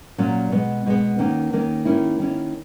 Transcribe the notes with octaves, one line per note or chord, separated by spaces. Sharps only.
A#2 F#3 C#4
B2 G#3 B3
B2 G#3 B3
D#3 A#3 C#4
D#3 A#3 C#4
D#3 A#3 C#4 E4
D#3 A#3 C#4 E4